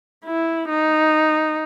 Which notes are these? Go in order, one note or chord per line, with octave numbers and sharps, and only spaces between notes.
E4
D#4